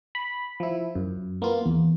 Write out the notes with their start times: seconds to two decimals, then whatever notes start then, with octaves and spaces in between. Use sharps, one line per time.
0.15 B5
0.60 F3 E4
0.95 F#2
1.42 A#3 B3 F4
1.66 E2